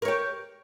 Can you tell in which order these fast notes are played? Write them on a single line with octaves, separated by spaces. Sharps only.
A#4 C#5 G4